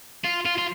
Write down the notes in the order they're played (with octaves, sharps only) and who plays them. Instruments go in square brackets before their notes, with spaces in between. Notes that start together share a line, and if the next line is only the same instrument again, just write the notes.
[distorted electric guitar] F4
F4
F4